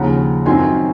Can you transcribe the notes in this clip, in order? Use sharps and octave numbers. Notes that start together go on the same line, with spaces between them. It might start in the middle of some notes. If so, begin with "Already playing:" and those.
Already playing: D#2 C#3 F3 F#5 A#5
F#2 D#3 F#3 C4 G#5 C6